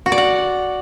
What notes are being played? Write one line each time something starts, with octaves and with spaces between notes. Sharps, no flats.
F#4
D5
F#5